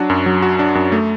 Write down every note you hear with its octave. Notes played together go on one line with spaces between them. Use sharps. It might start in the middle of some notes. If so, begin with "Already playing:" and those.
Already playing: F#3 D4 F#4
F#2
F#3
F#4
D4
F#2
A3